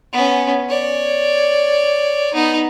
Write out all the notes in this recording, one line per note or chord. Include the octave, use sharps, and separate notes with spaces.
B3 C#4
C#5 D5
B3 D#4